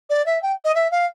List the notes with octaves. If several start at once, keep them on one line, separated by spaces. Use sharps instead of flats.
D5
E5
G5
D#5
E5
F5